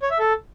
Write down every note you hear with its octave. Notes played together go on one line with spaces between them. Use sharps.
C#5
E5
A4